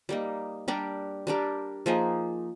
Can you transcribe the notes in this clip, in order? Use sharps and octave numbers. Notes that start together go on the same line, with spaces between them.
G3 A#3 D#4
G3 D4 G4 A#4
G3 D4 G4 A#4
F3 A#3 D#4 G#4